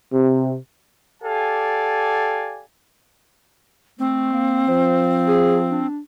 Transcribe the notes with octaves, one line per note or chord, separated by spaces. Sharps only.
C3
G4 A4 D5 F5 G#5
A3 C4
A#3
F3 C5
G#4
D4